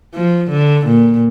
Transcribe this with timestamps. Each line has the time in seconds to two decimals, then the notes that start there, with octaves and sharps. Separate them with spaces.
0.15 F3
0.51 D3
0.87 A#2